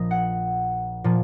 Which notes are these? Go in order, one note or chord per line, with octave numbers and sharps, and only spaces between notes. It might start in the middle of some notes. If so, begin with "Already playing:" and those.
Already playing: A#1 A#2 F3 D#5
F#5
A#2 F3